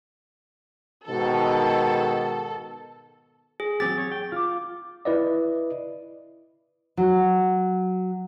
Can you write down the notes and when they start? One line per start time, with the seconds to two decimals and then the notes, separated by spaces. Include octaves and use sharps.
1.07 G#2 B2 D#3 A4
3.60 G#4
3.80 F#3 C4 G4 A6
3.98 C#5
4.12 G5
4.32 F4 D6
5.05 E4 B4 D5 D#5
6.97 F#3